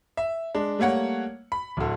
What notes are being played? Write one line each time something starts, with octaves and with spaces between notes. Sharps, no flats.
E5
G#3 D4
G3 A3 A#3 C#5 F#5
B5
D1 D3